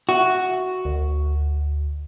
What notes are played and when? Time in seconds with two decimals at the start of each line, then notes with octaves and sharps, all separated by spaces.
0.09 F#4 E5
0.85 D2